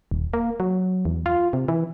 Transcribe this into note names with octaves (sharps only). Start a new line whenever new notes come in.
D#1
A#3
F#3
E2
F4
C3
E3